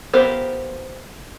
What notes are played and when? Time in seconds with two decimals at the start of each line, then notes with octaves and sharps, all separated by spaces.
0.14 B3 F4 G4 A#4 C5